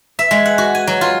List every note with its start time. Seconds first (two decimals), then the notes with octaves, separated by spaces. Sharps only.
0.19 E5
0.31 G#3
0.45 F#5
0.58 F#4
0.75 G#5
0.87 F#3
1.01 F4